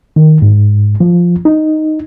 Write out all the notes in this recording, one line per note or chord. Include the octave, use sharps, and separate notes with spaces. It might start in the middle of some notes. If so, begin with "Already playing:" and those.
D#3
G#2
F3
D#4